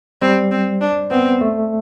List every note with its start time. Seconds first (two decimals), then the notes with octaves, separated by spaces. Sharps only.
0.22 G3 C4
0.51 C4
0.81 D4
1.11 B3 C4
1.41 A3